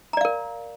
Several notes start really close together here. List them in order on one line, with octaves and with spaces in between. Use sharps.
A#5 D5 F5 A#4